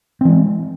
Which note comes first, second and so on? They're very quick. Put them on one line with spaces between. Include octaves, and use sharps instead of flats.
C4 E3 G#3